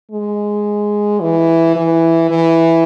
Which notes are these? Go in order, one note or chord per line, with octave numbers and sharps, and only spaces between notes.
G#3
E3
E3
E3